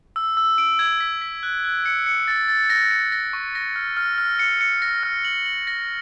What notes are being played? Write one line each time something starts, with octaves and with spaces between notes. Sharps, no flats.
E6
E6
D7
G#6
B6
B6
F#6
F#6
C#7
C#7
A6
A6
A#6
C#7
A#6
C#6
A#6
F6
F6
F6
C#7
C#7
A#6
F6
F#7
F#7
A#6